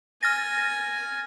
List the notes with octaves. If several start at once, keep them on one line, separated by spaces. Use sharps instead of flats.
G#5 F6 A6 A#6